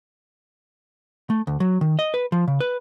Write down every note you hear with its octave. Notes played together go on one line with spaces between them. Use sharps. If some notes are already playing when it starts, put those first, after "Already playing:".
A3
D2
F#3
D#3
D#5
B4
F3
C#3
B4